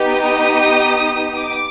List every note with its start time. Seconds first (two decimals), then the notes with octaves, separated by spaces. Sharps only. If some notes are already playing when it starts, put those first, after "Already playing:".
Already playing: B3 D#4 G4
0.13 D#6
1.39 D6